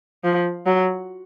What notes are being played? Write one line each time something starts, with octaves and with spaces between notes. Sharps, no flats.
F3
F#3